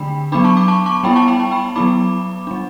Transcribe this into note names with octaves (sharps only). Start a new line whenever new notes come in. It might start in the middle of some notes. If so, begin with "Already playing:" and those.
Already playing: D3 A3 D4 G5 B5
F#3 B3 D4 B5 D6
A5 C#6
B5 D6
A5 C#6
A5 C#6
G3 B3 E4 G5 B5
A5 C#6
G5 B5
A5
G5 B5
F#3 B3 E4 B5 D6
G3 D4